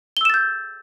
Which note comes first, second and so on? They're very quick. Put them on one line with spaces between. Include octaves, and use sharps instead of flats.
G7 E6 E7 A6 G6